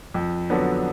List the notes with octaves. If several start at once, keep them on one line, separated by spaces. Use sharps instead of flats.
F2
D3 F#3 B3 D4